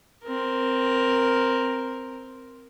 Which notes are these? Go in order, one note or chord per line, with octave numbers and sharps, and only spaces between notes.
C4 A#4